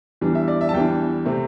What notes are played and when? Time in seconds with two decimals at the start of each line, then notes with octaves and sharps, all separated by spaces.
0.21 E2 E3 G3 D4
0.35 E5
0.48 D5
0.61 E5
0.69 A5
0.74 E2 E3 G3 D4 G5
1.25 C3 A3 C4